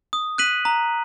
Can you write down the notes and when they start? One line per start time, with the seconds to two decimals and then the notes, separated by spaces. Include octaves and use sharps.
0.13 D#6
0.38 F#6 B6 D#7 F#7
0.65 A#5